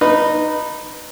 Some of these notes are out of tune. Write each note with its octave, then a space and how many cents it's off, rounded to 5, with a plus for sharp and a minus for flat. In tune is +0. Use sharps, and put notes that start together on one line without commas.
D#4 -15 B4 +0